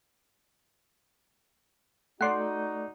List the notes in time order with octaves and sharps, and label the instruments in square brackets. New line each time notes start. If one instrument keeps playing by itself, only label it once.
[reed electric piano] A3 D5 [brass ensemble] D#4 F#4 [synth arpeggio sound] F#5 C6